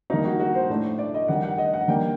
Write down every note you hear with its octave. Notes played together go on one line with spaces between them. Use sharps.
D#3 G3 A#3 D4 D#4
F#4
F#4
C5
A2 A3 D4
D5
D#5
D#3 G3 D4 F#5
F#5
D#5
F#5
D#3 G3 A#3 D4 G5